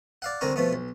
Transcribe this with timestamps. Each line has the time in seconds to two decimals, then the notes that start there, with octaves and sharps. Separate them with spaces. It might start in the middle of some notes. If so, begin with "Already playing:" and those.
0.22 D5 F5 F#5
0.41 C2 D3 C4 A#4 G#5 C#6
0.56 B2 F3 A3 B3
0.73 B1